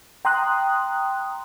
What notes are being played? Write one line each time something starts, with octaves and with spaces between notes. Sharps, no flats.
G5 A#5 C6 D#6 F#6